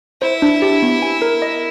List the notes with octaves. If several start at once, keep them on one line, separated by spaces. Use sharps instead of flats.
E4 C5
D4
G4
B3
G#5
A#4
D#5